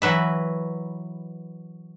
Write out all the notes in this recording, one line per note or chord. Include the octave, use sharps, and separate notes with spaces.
E3 F#3 B4 E5